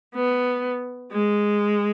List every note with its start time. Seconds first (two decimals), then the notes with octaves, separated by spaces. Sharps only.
0.14 B3
1.12 G#3